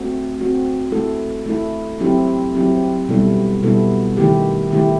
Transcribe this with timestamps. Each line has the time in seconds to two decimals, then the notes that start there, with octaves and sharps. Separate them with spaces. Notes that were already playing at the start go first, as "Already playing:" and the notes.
Already playing: A3 C4 F#4
0.38 A3 C4 F#4
0.92 A3 E4 A4
1.46 A3 E4 A4
2.00 F#3 C4 E4 G4
2.55 F#3 C4 E4 G4
3.08 B2 G3 B3 E4 A4
3.63 B2 G3 B3 E4 A4
4.17 D#3 A3 E4 G4
4.71 D#3 A3 E4 G4